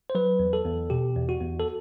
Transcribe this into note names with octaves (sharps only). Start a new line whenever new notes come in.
C5
F#3 B4
E2
A4
E2
B2 G4
E2
F#4
E2
A4